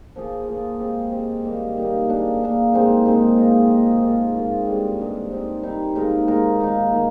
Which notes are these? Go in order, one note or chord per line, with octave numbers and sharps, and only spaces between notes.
F3 A#3 F4 G#4
F3 A#3 F4 G#4
G#3 C4 G4
G#3 C4 G4
D#3 G3 A#3 D#4
D#3 G3 A#3 D#4
A#3 D4 G#4
A#3 D4 G#4
A#2 G#3 C4 D#4
A#2 G#3 C4 D#4
A#3 F4 G#4 D#5
A#3 F4 G#4 D#5
G#2 F3 A#3 F4
G#2 F3 A#3 F4
G2 D3 G#3 D4
G2 D3 G#3 D4
G3 C4 D#4
G3 C4 D#4
A#2 G#3 D#4 A#4
A#2 G#3 D#4 A#4
D#3 A#3 D#4
D#3 A#3